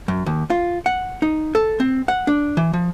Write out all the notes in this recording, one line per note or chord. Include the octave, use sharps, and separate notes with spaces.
F#2
D#2
F4
F#5
D#4
A4
C4
F#5
D4
E3
F3